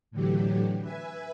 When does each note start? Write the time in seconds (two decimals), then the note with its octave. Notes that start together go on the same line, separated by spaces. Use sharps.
0.11 A2 D3 E3 F#3 G4
0.80 B4 E5 G#5